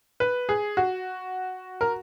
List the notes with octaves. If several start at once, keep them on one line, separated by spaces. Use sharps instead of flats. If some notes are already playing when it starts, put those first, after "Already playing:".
B4
G#4
F#4
A#4